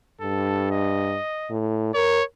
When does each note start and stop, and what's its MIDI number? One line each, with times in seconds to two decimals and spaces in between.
0.21 1.18 43
0.21 0.70 69
0.71 1.53 75
1.50 1.94 45
1.95 2.21 70
1.95 2.24 73